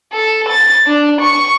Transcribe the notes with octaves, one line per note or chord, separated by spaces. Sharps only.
A4
A6
D4
C#6